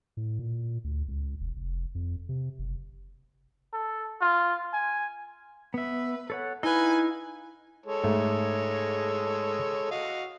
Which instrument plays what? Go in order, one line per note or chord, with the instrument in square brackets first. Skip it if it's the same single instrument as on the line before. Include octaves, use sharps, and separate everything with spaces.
[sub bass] A2
A#2
D2
C#2
E1
F1
F2
C3
F#1
[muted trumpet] A4
F4
G#5
[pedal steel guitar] B3 E5 [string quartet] B4
[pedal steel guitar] A4 C#5 F#5
[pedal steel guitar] D#4 F5 [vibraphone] E4 [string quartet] B4 G#5
[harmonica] G#3 A4 C#5
[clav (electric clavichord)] G#2 A3
[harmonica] F#4 D#5 F5